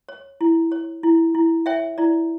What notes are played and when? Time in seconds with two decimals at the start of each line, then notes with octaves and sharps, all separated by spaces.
0.09 C#5
0.41 E4
0.72 C#5
1.03 E4
1.35 E4
1.66 C#5 E5 G5
1.98 E4 D5